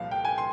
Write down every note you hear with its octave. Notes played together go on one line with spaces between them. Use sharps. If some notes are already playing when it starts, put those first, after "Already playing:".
Already playing: C2 A#2 F3 F5
G5
G#5
C6